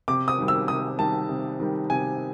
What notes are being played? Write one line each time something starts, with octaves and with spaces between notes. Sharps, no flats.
C3 D6
D#6
D#3 G3
E6
C3 D#6
D#3 G3 A5
C3
D#3 G3
C3 G#5